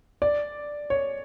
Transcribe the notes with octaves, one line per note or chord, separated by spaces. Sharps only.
D5
C#5